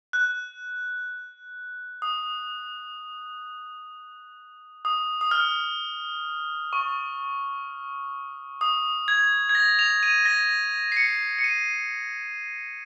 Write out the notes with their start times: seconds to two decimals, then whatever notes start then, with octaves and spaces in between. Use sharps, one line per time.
0.13 F#6
2.02 D#6
4.85 D#6
5.21 D#6
5.31 F6
6.73 C#6
8.61 D#6
9.08 G#6
9.49 G#6
9.55 A#6
9.79 F7
10.03 D#7
10.25 A#6
10.92 C7
10.97 C#7
11.39 C#7
11.44 D#7